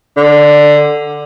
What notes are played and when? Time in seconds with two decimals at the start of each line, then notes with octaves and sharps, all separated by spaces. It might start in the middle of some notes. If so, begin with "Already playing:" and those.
0.17 D3